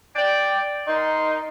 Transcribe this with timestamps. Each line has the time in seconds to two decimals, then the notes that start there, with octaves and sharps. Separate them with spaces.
0.16 D5 G5
0.88 D#4 A#4 C6